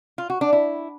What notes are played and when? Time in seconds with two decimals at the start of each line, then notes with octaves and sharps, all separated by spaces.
0.18 F4
0.30 F#4
0.41 D4
0.53 E4